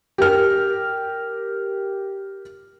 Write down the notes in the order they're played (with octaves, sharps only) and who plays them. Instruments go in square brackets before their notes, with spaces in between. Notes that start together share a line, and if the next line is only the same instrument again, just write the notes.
[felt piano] G4 A#4 F6